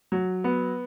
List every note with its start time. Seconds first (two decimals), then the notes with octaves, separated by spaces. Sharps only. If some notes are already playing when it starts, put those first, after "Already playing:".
0.12 F#3
0.44 B3